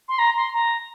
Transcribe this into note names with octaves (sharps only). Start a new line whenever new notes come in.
C6
A#5
C6
A#5